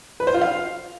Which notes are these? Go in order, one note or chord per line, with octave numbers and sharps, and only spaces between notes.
B4
C5
F4
F5